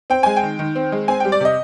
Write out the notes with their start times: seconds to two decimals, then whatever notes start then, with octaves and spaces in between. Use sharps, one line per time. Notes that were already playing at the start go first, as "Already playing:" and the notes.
0.10 C4 G5
0.23 G#3 G#5
0.36 G5
0.43 D#3
0.59 D#3
0.75 C4
0.92 G#3
1.08 C4 G#5
1.20 G5
1.25 G3
1.32 D5
1.40 C3 D#5